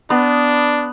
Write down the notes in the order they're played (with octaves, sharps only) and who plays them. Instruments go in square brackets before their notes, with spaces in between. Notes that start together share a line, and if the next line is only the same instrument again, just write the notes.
[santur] B3 [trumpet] D4